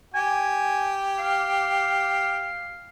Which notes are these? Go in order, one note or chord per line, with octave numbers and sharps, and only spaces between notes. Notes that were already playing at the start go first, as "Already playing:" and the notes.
G4 G#5
F5